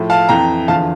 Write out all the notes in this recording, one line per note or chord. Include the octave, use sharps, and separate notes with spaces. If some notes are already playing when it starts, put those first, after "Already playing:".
Already playing: A2 F3
F5 A5
F2 E3 G5 A#5
E2 D3 F3 F5 A5